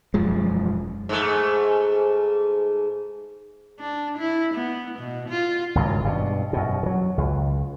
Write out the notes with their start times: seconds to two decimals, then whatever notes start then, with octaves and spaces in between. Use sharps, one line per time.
0.14 E1 F#2 F3 G#3
1.09 G#2 A3
3.80 D4
4.18 E4
4.54 B3
4.99 B2
5.29 F4
5.75 G#1 C#2 G2
6.05 G2 B2
6.53 F#2 B2
6.83 D#3 F#3
7.18 C#2